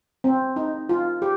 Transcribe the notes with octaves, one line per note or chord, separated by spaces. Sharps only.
C4
D#4
F4
G4